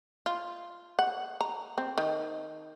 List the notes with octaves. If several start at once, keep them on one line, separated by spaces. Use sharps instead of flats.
F4
F#5
A#5
C4
D#3